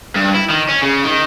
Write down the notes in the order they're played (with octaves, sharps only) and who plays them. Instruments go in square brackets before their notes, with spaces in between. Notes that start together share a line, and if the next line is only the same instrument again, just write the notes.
[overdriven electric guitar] G2
E4
D#3
C#4
C#3
D#3